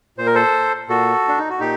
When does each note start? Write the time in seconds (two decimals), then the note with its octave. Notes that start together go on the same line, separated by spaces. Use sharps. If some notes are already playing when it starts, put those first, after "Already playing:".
0.18 A#2 C5
0.26 A#4
0.35 A4 C5
0.89 A#2 F#4 A4
1.28 D4
1.38 D#4
1.50 F#4
1.60 A#2 D#4 G4